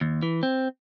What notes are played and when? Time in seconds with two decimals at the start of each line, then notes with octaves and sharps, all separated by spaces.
0.01 D#2
0.23 E3
0.43 C4